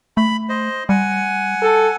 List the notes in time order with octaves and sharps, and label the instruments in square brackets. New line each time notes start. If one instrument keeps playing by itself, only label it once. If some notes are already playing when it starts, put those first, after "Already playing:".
[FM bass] A3 [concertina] B5
[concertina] C5 D#5
[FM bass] G3 [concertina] F#5 G#5
[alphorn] A4